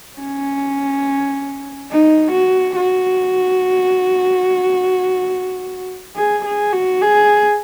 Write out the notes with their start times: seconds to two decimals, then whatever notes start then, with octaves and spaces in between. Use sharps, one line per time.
0.20 C#4
1.91 D#4
2.32 F#4
2.76 F#4
6.17 G#4
6.46 G#4
6.73 F#4
7.02 G#4